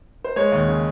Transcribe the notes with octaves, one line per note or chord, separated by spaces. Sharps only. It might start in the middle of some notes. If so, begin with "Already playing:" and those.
C5
G#3 C#5
D#2
C#3